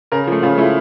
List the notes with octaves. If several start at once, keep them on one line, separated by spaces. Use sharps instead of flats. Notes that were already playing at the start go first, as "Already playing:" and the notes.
C#3 A#4
F3 A3
C#3 F4
F3 A3 E4